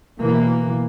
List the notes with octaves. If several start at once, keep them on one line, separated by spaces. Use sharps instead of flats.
B2 E3 A#3